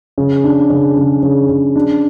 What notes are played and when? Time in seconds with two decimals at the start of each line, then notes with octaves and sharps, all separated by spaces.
0.18 C#3
0.44 D4
0.70 C#3
0.97 C#3
1.23 C#3
1.49 C#3
1.76 D4